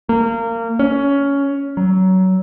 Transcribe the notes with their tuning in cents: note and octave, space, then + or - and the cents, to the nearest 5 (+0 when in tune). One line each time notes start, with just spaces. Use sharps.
A#3 -25
C#4 +15
F#3 +20